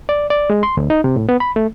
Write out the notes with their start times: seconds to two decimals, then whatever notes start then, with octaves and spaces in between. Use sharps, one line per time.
0.09 D5
0.30 D5
0.50 G#3
0.63 C6
0.77 D2
0.90 D#4
1.04 C3
1.16 A2
1.29 B3
1.40 B5
1.56 A3